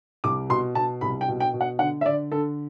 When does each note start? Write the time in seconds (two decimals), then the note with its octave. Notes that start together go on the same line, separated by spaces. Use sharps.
0.24 C2 D6
0.49 B2 C6
0.75 B2 A5
1.01 C2 B5
1.21 G5
1.28 B2
1.40 G5
1.54 B2
1.61 F#5
1.79 D3 F#5
2.01 E5
2.06 D3 D5
2.32 D3 A4